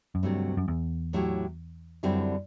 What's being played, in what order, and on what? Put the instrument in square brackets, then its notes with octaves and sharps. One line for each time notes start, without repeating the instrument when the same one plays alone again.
[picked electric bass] F#2
[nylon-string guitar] D2 C3 F#3 A3 C4 [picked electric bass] G2
[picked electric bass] F#2
E2
[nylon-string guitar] A2 F#3 A3 E4 G4
F#2 D3 G3 C4 E4